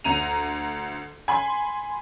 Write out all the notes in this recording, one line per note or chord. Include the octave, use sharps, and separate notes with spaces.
D2 A#5 D#7 F7
G#5 B5 C6